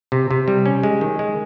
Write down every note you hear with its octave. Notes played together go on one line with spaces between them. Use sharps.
C3
C3
G3
C#4
G#3
D#3
G#3